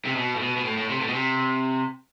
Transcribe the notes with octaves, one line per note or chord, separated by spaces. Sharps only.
C3
B2
A2
B2
B2
A2
A2
C3
A2
B2
C3